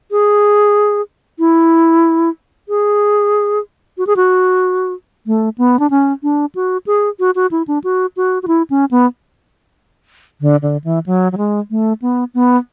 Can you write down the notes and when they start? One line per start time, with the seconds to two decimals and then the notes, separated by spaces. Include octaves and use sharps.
0.11 G#4
1.39 E4
2.69 G#4
3.98 F#4
4.07 G#4
4.16 F#4
5.27 A3
5.58 B3
5.79 D4
5.90 C#4
6.23 D4
6.55 F#4
6.87 G#4
7.20 F#4
7.35 F#4
7.51 E4
7.68 D4
7.84 F#4
8.16 F#4
8.43 F#4
8.48 E4
8.70 C#4
8.91 B3
10.41 D3
10.62 D3
10.84 E3
11.06 F#3
11.32 F#3
11.37 G#3
11.71 A3
12.02 B3
12.34 B3